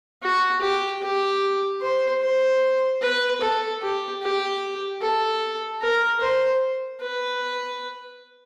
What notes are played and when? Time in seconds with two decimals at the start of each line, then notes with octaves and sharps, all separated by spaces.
0.22 F#4
0.61 G4
1.02 G4
1.81 C5
2.22 C5
3.02 B4
3.41 A4
3.82 G4
4.22 G4
5.01 A4
5.82 A#4
6.21 C5
7.01 B4